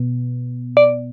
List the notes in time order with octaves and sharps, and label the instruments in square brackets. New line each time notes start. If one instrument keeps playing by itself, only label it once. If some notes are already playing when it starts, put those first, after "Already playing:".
Already playing: [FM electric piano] B2 B3
[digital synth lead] D5